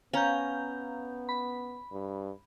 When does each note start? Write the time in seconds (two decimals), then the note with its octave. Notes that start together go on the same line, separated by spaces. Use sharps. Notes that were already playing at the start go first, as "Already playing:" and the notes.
0.13 B3 C#4 F5 A#5 G6
1.29 B5
1.92 G2